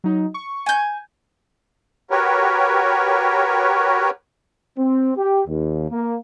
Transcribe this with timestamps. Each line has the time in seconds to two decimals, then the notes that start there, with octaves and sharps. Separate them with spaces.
0.04 F#3 D#4
0.34 C#6
0.66 G#5 G6
2.11 F#4 G4 A#4 B4 C#5
4.77 C4
5.16 G4
5.47 D#2
5.90 A#3